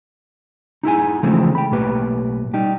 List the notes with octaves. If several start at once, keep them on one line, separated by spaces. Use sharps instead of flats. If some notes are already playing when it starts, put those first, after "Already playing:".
D#4 E4 G#4 G#5
C#3 E3 F3 G#3 A3 C4
G5 B5
B1 A2 A#3 G4 B4
G3 D#4 G4